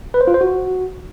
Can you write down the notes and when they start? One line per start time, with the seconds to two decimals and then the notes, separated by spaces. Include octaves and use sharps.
0.14 B4
0.21 C5
0.28 F4
0.34 C5
0.41 F#4